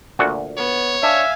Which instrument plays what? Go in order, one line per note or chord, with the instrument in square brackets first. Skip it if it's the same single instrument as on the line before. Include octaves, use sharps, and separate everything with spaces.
[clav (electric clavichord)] D2 A#2 F#4
[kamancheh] B3 [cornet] C#5
[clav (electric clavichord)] D4 [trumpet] E5 [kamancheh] F5 G#5